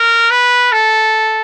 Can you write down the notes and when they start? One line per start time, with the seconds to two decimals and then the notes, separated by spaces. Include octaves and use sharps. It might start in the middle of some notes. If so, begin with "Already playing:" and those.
Already playing: A#4
0.30 B4
0.72 A4